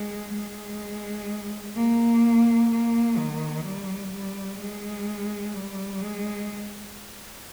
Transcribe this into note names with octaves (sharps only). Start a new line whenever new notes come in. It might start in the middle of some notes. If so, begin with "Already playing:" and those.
Already playing: G#3
G#3
A#3
A#3
D#3
G3
G3
G#3
G3
G#3